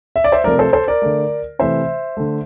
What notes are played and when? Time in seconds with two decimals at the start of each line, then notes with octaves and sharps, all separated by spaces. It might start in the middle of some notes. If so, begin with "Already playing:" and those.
0.16 E5
0.24 D5
0.32 C5 E5
0.44 C3 F3 A3 A#4 D5
0.59 A4 C5
0.73 A4 C5
0.88 A#4 D5
1.02 D3 A3
1.59 C3 E3 A3 C5 E5
2.17 D3 A3